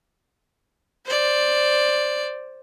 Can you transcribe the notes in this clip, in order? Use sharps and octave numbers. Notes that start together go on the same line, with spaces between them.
C5 D5